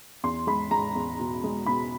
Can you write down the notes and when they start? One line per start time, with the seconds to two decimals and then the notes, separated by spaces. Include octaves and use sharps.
0.24 E2 C6
0.47 G#3 B5
0.71 G#3 A#5
0.95 E2
1.20 B2
1.44 G#3
1.66 B2 B5